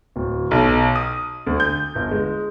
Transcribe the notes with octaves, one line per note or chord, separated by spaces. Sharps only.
D1
B1
D#6
D2
G6
G1
G#3